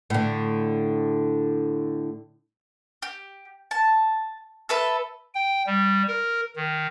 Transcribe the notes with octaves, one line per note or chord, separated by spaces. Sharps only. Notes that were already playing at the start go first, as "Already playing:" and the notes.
A2 D3
G4
A5
A4 B4 E5
G5
G3
A#4
D#3